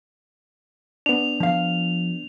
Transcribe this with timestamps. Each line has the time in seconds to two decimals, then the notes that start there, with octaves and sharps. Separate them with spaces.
1.06 B3 D4 F7
1.40 F3 F5